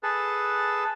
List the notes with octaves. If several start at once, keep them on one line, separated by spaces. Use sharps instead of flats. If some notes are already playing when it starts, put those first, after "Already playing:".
G#4 A4 B4 A5